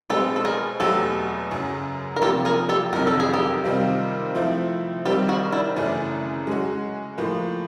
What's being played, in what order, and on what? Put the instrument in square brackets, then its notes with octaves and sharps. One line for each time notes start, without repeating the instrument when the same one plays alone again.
[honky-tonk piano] B2 G#3 C4 [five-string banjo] G4 A4
[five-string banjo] A4
G#4 A#4
[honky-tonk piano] E2 B2 F#3 A3 [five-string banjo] G4 A4
[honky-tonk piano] F#2 C#3 F#3
[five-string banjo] A#4
[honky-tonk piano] C3 F3 A#3 [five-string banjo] G4 A4
[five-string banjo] G#4 A#4
G4 A4
[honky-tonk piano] F2 C3 D#3 F#3 [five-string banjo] A#4
[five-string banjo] A4
G#4
G4 A4
[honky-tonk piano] C3 D#3 G3 C4 F4
F3 A3 C4 E4
[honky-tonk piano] D#3 G3 C4 [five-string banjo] G4 A4
[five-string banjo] F#4 G#4
D4 E4
[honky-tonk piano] F#2 C#3 E3 A3 C#4 [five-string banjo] D4
[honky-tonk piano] G#3 C#4 F#4
A2 F3 A#3